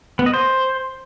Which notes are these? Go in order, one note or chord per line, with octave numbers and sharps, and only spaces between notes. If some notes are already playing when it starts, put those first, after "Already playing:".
B3
D#5
C5